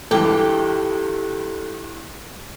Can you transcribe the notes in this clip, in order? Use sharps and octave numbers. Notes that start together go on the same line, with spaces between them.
C#2 G2 E3 G4 A4